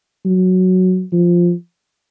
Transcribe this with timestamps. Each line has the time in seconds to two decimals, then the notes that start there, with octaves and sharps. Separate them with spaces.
0.25 F#3
1.13 F3